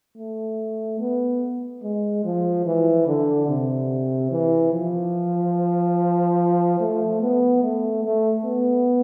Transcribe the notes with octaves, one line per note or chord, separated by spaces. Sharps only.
A3
B3
G#3
F3
E3
D3
C3
E3
F3
A3
B3
A3
A3
B3